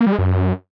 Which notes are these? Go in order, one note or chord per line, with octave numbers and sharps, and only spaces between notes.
A#3
G3
G#3
F#2